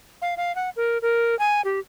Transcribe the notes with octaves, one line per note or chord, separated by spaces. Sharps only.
F5
F5
F#5
A#4
A#4
G#5
G4